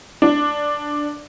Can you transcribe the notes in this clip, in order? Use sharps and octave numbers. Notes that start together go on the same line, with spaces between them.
D4